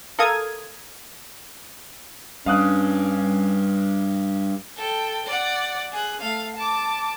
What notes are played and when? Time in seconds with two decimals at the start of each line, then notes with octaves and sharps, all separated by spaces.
0.19 A4 A#4 F5 D#6 G#6
2.46 G2 C#4 F5 D#6 F#6
4.76 A4 G5
5.26 D5 F#5
5.92 G#4 F#6
6.20 A3 F5
6.56 A5 D6